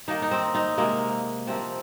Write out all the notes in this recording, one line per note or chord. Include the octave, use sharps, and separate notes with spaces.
D#3 A#3 D#4
D#4
C4
D#4
C3 G#3 A#3
C3 F3 A#3 C4